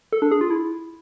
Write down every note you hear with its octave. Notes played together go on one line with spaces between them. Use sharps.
A4
D4
G#4
F4
E4